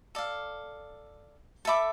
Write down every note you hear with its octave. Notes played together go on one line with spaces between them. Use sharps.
A4 D5 F5
A4 E5 B5 D6